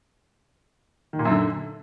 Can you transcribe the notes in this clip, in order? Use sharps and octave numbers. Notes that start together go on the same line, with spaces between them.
D#3
A#2
F#2
D3